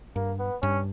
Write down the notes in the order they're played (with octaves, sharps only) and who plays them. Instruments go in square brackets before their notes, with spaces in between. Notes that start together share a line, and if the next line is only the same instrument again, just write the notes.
[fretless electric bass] G2 [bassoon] A#3
[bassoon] B3
[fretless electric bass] G2 [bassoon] C#4